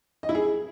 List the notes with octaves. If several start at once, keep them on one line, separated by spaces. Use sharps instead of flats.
D#5
E4
G#4